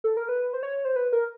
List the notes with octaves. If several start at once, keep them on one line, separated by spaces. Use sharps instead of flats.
A4
A#4
B4
C5
C#5
C5
B4
A#4